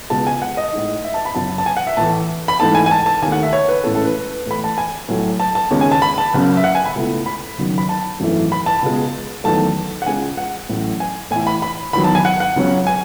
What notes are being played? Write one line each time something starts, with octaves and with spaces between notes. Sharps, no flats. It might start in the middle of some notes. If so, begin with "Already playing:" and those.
C#2 B2 G#3 A5
G#5
F#5
D#5
A2 G#3 D#4
E5
A5
B5
F#2 C#3 F#3 A5
A5
G#5
F#5
E5
A2 E3 A3 A5
B5
G#2 E3 A3 D#4 A5
G#5
G#5
A5
A5
D#2 D#3 A3 G#5
F#5
E5
C#5
B4
A1 A2 G#3 C#4 E4 A4
A4
B4
A2 E3 A3 B5
A5
G#5
A2 F#3 A3
A5
A5
D#2 C#3 G#3 C#4
G#5
A5
B5
A5
F#1 F#2 C#3
E5
F#5
G#5
B5
C#2 B2 A3 E4
B5
F#1 F#2 D#3 F#3
B5
A5
G#1 F#2 E3 A3 E4
B5
A5
C#2 B2 G#3
E2 D#3 F#3 A3 A5
F#5
C#2 C#3 G#3 G#5
F#5
A1 A2 F#3
G#5
A2 E3 A3 E4 G#5
B5
B5
E2 D#3 F#3 B5
A5
G#5
F#5
F#5
C#2 C#3 F#3 C#4
G#5